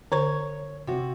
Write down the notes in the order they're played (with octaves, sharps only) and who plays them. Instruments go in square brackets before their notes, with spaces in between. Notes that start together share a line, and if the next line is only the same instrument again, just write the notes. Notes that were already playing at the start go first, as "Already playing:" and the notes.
[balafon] D3 C5 C#6 [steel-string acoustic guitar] C#5
[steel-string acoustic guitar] C3 F#4